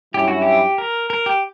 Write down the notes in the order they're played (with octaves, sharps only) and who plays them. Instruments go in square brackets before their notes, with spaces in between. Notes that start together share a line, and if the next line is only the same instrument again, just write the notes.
[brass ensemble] G2 F#3 C#4 E4 [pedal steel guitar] G4
[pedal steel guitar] F#4
G4
A#4
A#4
G4